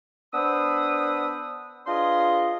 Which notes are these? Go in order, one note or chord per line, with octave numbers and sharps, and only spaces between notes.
B3 D4 C5 B5 D#6 E6
D4 F4 G#4 B4 D#5 C6